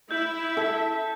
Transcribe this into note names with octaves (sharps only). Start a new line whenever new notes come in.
E4 E5 G6
A4